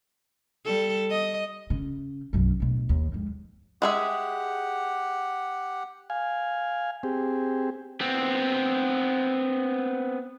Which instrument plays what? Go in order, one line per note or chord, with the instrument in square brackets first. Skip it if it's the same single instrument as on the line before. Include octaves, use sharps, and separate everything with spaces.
[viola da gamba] G3 A4
D#5
[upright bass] C#3
B1 F#2
D1 B2
D#2
F2 G#2
[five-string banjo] G#3 G#4 E5 [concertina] G4 F#5
[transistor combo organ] F5 G#5
C4 G4 G#4
[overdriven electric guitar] B3 C4